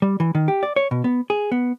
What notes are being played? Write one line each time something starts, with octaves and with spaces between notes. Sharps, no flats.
G3
E3
D#3
G4
D5
C#5
B2
B3
G#4
B3